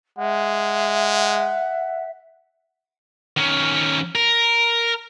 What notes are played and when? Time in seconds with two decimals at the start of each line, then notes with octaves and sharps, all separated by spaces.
0.19 G#3 E5 F#5
3.37 D#3 C#4
4.15 A#4